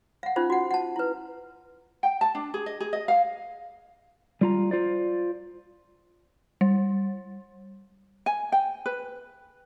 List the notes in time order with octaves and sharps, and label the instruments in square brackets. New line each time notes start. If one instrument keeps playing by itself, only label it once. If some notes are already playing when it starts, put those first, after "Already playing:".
[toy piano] F5 F#5
C#4 D#4 F4 C5
F#4 F#5
F#5 A5
E4 B4
[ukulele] G5
A5
D4
G#4
D#5
G#4
D#5
F5
[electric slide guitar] G3 F4 A#5
F4 C5 D5
[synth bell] G3
[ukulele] G#5
G5
B4